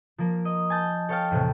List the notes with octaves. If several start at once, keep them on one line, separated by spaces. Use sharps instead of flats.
F3 A#3
D#5
G#5 A5 G6
A4 C#5 F5 G5 A5 F6
E2 A2 C3